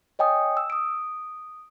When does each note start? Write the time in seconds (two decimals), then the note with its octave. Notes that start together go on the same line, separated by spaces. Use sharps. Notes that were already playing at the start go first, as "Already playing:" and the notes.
0.19 C#5 D#5 G5 G#5 D#6
0.57 E6
0.70 D#6 D7